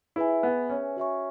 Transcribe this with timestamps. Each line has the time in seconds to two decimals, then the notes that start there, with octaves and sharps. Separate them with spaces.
0.16 E4 G#4 B4 E5 G#5
0.43 B3
0.70 C#4
0.97 F#4 C#5 E5 G#5 C#6